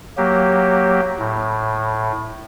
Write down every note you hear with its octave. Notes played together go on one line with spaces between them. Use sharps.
F#3 A#3 G4
A2